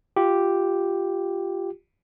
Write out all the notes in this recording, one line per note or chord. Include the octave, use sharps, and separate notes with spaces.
F4 G4